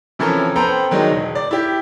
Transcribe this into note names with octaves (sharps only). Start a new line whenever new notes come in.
C3 E3 F3 C#4 A4 A#4
B3 A4 C5 G5 A#5
D#3 F#3 G#3 D4 D#4
E1
D5
E4 G4